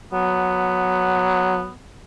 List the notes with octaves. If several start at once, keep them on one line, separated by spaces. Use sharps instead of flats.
F#3 B3